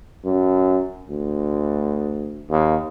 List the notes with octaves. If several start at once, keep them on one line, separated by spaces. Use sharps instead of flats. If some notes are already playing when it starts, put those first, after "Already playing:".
F#2
D2
D#2